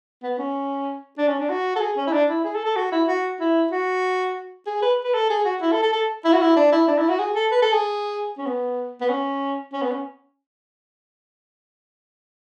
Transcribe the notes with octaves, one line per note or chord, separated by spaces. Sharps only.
B3
C#4
D4
C#4
D4
F#4
A4
G#4
C#4
E4
D4
E4
G#4
A4
A4
F#4
E4
F#4
E4
F#4
G#4
B4
B4
A4
G#4
F#4
E4
A4
A4
A4
E4
F#4
E4
D4
E4
D4
E4
F#4
G#4
A4
B4
A4
G#4
C#4
B3
B3
C#4
C#4
B3
C#4